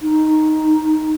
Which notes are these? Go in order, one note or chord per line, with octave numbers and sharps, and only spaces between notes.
D#4